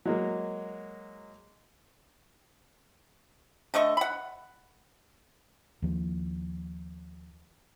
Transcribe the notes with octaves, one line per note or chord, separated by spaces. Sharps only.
F#3 G#3 A#3
D3 A3 D#5 C#6
F#5 B5
D#2 F3